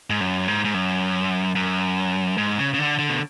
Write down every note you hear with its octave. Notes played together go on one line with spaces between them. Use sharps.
G#2
F#2
G#2
G#2
F#2
F#2
G#2
C#3
C#3
D3
D3
B2